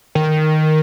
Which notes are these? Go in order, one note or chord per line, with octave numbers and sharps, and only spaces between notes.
D#3